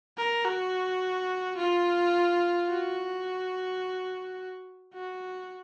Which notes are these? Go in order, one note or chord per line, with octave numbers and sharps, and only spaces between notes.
A#4
F#4
F4
F#4
F#4